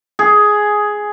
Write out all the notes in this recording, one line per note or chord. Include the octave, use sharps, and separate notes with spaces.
G#4